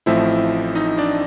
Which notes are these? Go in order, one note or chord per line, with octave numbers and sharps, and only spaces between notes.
A1 A2 F3 A3 C4 E4 E5
D#4 D#5
D4 D5